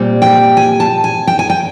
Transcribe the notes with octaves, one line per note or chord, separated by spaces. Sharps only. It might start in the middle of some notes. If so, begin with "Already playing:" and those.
Already playing: A#2 G3 C4
G5
G#5
A5
G#5
G5
G#5
G5